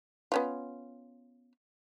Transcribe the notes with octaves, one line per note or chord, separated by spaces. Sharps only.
B3 C#4 F4